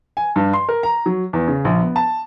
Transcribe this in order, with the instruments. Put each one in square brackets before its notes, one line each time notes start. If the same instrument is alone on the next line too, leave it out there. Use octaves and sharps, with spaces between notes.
[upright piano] G#5
G2
C6
A#4
A#5
F#3
E2
C#3
A#1
B3
A5